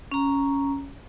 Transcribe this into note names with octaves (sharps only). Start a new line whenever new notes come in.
C#4 A#5